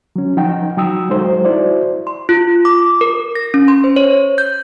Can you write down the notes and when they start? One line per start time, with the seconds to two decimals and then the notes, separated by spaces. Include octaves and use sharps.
0.16 F#3 C#4
0.37 F3 D#4 F#5 G5
0.77 F#3 G5 D#6 E6
1.10 F#3 G#3 D#4 A4 C5
1.45 E4 F#4 C5 D5
2.07 C6
2.29 F4
2.65 D6
3.01 A#4
3.35 A#6
3.54 C#4
3.68 C6
3.84 C5
3.96 C#5
4.38 G6